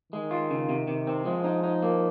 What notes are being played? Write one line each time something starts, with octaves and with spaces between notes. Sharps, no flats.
D#3 G#3
F4
C#3
C3
C3
C4
F3 G#3
D#4
D#4
A#3